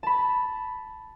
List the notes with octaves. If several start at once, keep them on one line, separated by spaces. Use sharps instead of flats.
A5 B5